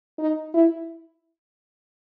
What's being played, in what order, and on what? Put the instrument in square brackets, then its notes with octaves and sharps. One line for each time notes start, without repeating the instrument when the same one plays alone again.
[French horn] D#4
E4